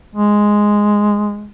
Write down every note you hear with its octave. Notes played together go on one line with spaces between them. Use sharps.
G#3